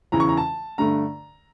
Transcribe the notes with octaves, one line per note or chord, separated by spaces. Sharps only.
E2 C#3 E3 A#5
C#6
A#5
A5
G2 D3 A3 A#5